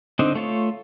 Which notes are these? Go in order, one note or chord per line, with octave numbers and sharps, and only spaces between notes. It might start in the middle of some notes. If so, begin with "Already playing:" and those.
D3 C4 D4 D#4
A3 F4 C#5